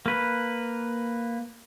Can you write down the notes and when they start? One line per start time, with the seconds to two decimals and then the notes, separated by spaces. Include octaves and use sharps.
0.06 A#3 B4